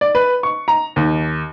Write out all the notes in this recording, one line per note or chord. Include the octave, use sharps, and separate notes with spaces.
D5
B4
C#6
A#5
D#2